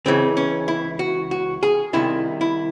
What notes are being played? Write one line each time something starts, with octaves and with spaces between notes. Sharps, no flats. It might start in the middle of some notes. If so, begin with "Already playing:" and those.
C#2 C#3 E3 C4
C#4
E4
F#4
F#4
G#4
C2 C3 D#3 E4
E4